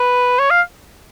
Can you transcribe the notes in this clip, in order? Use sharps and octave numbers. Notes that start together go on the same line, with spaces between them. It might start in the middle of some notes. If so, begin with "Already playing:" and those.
Already playing: B4
C#5
F5